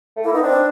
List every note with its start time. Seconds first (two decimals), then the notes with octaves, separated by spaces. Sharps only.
0.17 A3
0.24 A#3 E4
0.33 B3 D#4
0.42 C4 D4